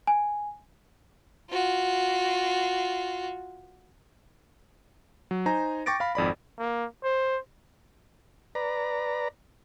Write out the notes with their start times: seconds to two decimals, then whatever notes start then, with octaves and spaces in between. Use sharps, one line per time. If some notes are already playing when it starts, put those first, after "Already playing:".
0.07 G#5
1.51 F4 F#4
5.31 F#3
5.46 D#4 C5 G#5 A#5
5.86 G5 C#6 D6 A6 A#6 D7
6.00 F5 B5
6.15 G#1 F2 D5 B5
6.59 A#3
7.04 C5
8.55 B4 D5 A#5